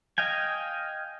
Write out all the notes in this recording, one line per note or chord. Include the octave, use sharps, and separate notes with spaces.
D#5 F5 G5 G#5